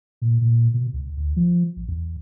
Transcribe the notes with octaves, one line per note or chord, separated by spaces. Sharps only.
A#2
A#2
B2
C#2
D2
F3
A1
E2